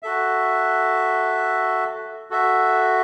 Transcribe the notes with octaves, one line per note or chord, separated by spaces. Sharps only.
F#4 A4 E5
F#4 A4 E5